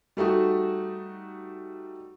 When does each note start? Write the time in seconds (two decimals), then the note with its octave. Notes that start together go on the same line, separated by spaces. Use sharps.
0.17 G3 A3 D#4 F#4